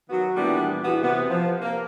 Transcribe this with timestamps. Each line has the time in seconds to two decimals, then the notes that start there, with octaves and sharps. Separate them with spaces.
0.10 D#3 F#3 B3 F#4
0.37 A#2 E3 G3 A3 B3 D4
0.85 E2 E3 B3 E4 F#4 G4
1.03 C3 B3
1.30 F3
1.62 A#3 F5